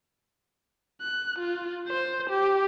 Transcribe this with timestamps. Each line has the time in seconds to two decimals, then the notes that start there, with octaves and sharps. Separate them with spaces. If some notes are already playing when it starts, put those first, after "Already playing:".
1.01 F#6
1.39 F4
1.88 C5
2.30 G4